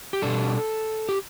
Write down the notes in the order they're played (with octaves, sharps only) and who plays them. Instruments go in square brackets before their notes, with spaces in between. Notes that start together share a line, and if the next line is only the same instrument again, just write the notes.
[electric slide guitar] G4
B2 G3 D4 A4
G4